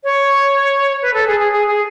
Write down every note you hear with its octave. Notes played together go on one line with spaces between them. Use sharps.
C#5
B4
A4
G#4
G#4
G#4
G#4